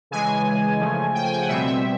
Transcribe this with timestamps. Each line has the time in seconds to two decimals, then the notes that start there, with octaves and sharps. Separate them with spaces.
0.11 C#3 E3 G#3 G#5
0.80 C#3 F3 A3
1.15 G5
1.24 G#5
1.32 G5
1.41 F#5
1.49 B2 G3 C4 E5
1.66 E5